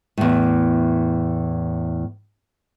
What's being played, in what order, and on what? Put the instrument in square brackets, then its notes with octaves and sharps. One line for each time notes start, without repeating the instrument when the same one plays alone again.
[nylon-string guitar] E2 A2